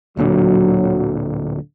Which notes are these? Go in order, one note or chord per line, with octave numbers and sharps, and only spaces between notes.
D1 A#2 D3 F#3